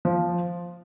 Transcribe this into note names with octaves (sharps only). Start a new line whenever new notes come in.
F3